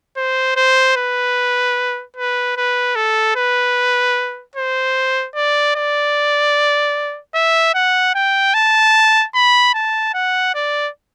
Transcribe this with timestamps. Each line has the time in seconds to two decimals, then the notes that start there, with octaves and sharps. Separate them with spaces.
0.17 C5
0.56 C5
0.96 B4
2.16 B4
2.57 B4
2.95 A4
3.36 B4
4.55 C5
5.35 D5
5.75 D5
7.34 E5
7.74 F#5
8.15 G5
8.54 A5
9.34 B5
9.74 A5
10.14 F#5
10.54 D5